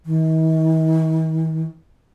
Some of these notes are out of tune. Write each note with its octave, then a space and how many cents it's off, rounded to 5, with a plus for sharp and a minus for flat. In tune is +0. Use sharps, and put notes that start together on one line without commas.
D#3 +45